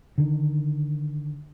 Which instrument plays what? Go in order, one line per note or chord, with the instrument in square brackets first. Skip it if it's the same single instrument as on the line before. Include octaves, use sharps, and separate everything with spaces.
[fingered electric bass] D3 D#3